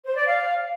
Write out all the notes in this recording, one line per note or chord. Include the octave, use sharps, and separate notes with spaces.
C5
D5
F5